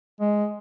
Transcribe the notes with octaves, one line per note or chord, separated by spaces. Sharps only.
G#3